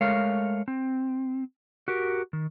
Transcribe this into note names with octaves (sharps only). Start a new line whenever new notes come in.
G#3 A3 A#4 C#5 F5
C4
F#4 G4 A#4
D#3